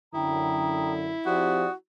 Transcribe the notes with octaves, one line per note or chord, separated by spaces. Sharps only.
F#2 D3 E4 G5 A#5 D#6
F3 C4 F#4 G4 D5 D#6